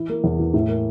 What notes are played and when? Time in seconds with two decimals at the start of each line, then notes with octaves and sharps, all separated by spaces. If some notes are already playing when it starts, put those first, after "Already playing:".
Already playing: E3 E4
0.09 A#3
0.24 E2
0.39 E3
0.54 A2
0.69 A#3